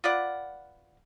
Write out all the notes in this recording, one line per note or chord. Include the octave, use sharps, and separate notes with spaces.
F4 B4 D5 F#5